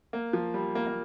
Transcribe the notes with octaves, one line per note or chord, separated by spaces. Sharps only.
A#3
F3
G3
A#3
A#3